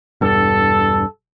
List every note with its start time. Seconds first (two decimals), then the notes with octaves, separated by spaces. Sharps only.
0.21 E1 G2 A4